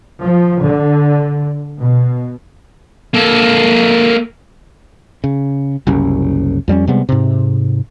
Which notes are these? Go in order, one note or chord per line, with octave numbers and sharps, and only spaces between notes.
F3
D3
B2
A#3 A4
C#3
F#1 C2 C#4
F2 G3 A#3 C#4
C3 G3 G#3 B3
G#2 C3